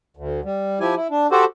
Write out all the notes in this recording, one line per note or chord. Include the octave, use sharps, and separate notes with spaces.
D2
G3
F3 E4 G4 G#5
E4
D4
F#4 G4 A4 C5